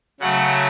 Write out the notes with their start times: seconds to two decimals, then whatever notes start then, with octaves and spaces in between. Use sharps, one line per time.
0.20 C#3 F#3 A3 F#5